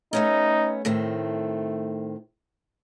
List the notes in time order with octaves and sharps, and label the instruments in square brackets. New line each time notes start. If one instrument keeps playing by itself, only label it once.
[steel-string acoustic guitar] A3 B3 C#4 [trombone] D#4
[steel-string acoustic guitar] A2 D#3 C4 [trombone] A3